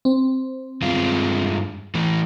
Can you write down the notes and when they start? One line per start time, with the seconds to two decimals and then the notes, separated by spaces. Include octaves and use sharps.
0.05 C4
0.82 G2 G#3 F4
1.95 E3 A3